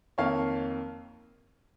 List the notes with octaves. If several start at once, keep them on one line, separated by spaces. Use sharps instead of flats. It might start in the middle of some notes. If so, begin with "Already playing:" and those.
F2 D#3 A#3 C#5 F5